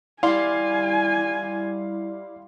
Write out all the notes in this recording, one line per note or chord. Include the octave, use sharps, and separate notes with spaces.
G3 E4 D5 F5 G#5 C6